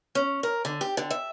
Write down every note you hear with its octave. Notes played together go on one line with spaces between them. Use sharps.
C#4
A#4
D3
G4
D3
E5